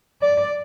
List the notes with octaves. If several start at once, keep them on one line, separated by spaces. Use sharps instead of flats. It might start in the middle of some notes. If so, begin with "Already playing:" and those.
D5